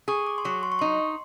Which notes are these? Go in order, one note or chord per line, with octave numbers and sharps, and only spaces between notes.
G#4 C#6
D6
C6
F#3 C#6
C6
C#6
D#4 C6